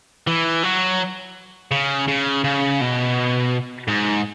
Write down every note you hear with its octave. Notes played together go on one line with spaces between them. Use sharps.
E3
F#3
C#3
C#3
C#3
B2
G#2